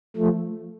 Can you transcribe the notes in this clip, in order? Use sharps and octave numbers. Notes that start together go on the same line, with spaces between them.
F3 A3